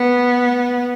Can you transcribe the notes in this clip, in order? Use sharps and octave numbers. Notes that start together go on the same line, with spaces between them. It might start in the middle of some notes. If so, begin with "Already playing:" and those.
Already playing: B3